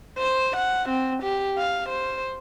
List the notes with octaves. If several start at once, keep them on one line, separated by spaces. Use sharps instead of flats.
C5
F#5
C4
G4
F5
C5